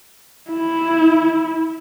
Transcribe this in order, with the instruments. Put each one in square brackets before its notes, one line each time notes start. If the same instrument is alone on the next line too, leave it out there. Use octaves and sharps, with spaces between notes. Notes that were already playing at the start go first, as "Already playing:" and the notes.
[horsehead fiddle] E4